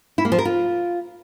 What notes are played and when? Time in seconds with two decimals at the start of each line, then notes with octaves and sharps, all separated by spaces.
0.18 E4
0.25 A#3
0.32 F3
0.39 A#4
0.45 F4